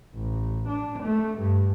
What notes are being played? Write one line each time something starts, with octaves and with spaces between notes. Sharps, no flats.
A1
D4
A3
G2